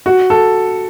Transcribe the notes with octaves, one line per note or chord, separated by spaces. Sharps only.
F#4
A4